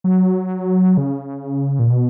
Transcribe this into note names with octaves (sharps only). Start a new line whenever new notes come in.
F#3
C#3
A#2
B2